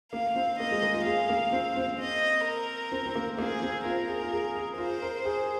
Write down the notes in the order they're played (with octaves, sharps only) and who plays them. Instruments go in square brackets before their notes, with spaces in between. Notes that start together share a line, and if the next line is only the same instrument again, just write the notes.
[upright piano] A#3 [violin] F5
[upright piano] C4
[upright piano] A#3 [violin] D#5
[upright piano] G#3
A#3
F4
[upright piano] G#4 [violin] F5
[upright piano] A#3
C4
C4
[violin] D#5
A#4
[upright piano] C4
C4
A#3
[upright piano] A#3 [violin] G#4
[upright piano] C4
[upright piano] F4 [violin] A#4
[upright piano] G#4
F4
G#4
G#4
[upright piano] F4 [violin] C5
[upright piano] A#4
G#4